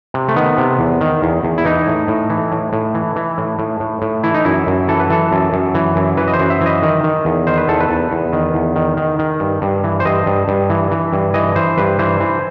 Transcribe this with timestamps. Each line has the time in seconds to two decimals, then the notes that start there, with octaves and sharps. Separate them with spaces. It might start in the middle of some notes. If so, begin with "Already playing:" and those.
0.14 C3
0.28 A3
0.36 D#3 B3
0.58 C3
0.79 E2
1.01 D#3
1.22 E2
1.43 E2
1.58 E4
1.65 E3 D#4
1.87 A2
2.08 A2
2.30 E3
2.52 A2
2.73 A2
2.95 E3
3.16 E3
3.38 A2
3.59 A2
3.80 A2
4.02 A2
4.24 E3 E4
4.34 D#4
4.45 F#2 E4
4.67 F#2
4.88 E3 A4
5.00 B4
5.10 E3 A4
5.32 F#2
5.53 F#2
5.75 E3
5.96 F#2
6.17 E3 B4
6.28 D#5
6.33 C5
6.39 F#2
6.50 E5
6.61 E3 D#5
6.82 D#3
7.04 D#3
7.25 E2
7.47 D#3 C5
7.58 B4
7.68 E2 A4
7.80 B4
7.89 E2
8.11 E2
8.33 D#3
8.54 E2
8.76 D#3
8.97 D#3
9.19 D#3
9.40 G2
9.62 G2
9.84 E3
10.00 C5
10.05 G2 D#5
10.26 G2
10.48 G2
10.70 E3
10.91 E3
11.13 G2
11.34 E3 D#5
11.56 E3 C5
11.78 G2 B4
11.99 E3 C5
12.20 E3